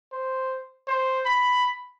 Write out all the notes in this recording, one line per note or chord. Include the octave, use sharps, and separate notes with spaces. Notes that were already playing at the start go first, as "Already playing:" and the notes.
C5
C5
B5